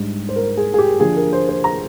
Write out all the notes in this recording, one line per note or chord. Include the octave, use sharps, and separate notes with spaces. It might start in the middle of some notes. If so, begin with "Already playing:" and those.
Already playing: G#2 G3 D4
C5
A#4
G#4
G#4
G4
D3 F3 A#3 D4 G#4
A#4
C5
C5
A#5